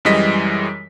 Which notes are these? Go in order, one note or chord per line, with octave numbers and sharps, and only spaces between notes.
F#2 E3 G3 G#3 D#5 B6